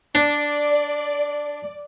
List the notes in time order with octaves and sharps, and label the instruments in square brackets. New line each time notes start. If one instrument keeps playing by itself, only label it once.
[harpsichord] D4 [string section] D5